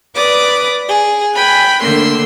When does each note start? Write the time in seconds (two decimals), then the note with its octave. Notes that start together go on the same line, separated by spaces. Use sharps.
0.15 B4 D5 D6 D#6
0.88 G#4
1.35 G5 G#5 B5 F#6
1.82 D3 A3 A#3 C6 E6